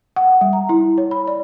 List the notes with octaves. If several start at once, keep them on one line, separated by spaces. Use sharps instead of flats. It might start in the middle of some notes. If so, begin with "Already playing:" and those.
F#5
G3
A#5
E4
C#5
B5
D5